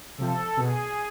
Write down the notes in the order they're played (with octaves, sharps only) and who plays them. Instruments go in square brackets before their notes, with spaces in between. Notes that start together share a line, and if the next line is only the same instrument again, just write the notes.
[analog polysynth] C3 F3 [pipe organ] A4
[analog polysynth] B2 [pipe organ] G#4